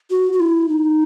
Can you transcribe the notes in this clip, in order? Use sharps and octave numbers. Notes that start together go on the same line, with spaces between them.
F#4
F#4
E4
D#4